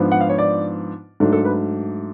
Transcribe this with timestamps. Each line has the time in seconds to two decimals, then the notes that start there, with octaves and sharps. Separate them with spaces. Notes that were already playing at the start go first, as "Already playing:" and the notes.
Already playing: G#2 F3 B3 D4
0.12 F#5
0.21 F5
0.29 C#5
0.38 D5
1.20 G#2 F#3 A3 D4
1.32 A4
1.45 B4